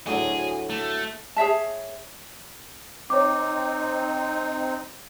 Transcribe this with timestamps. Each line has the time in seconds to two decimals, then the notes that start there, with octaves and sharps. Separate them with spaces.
0.07 D2 A2 F#3 G#4
0.70 A3
1.36 G#4 C#5 E5 A5
3.10 C4 D#4 C#5 D6